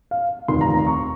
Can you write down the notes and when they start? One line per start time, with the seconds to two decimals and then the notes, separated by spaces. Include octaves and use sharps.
0.11 F5
0.48 F1 D#2 D#3 C6
0.61 A#5
0.74 A#5
0.87 C#6